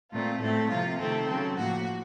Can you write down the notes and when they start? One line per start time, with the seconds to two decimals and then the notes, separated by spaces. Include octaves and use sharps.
0.12 A#2 A3 C4 F4
0.41 A2 A3 C4 A4
0.69 C3 F3 A#3 F4
0.99 C3 D#3 A3 C4 A4
1.27 C#3 F#3 C4
1.56 A2 F3 A#3 F#4